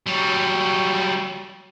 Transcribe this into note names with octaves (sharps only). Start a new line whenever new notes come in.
F#3 G3